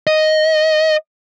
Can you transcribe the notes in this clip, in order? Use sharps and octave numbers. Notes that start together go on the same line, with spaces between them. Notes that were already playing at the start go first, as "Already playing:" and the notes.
D#5